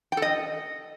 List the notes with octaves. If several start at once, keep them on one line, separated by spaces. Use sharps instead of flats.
G5
A4
D#5